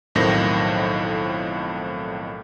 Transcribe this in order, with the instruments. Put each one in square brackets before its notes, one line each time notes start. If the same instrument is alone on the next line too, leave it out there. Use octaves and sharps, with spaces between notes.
[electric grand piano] B1 F2 A2 D#3 C5 A#6